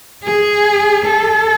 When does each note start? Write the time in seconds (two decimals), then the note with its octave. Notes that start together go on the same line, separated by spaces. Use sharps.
0.24 G#4
1.06 A4